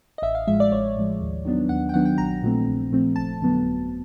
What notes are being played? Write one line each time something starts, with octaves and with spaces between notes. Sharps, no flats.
D#5
A1 E5
F5
A2 F3 G#3 E5
D5
A1 C#5
A2 F3 G#3
D#2
D#3 F#3 B3 D4
D#2 F#5
G5
D#3 F#3 B3 D4 F#5
G5
A#1 A#5
A#2 F3 A3 C4
A#1
A#2 F3 A3 C4
G1 A5
F2 D3 F#3 B3
G1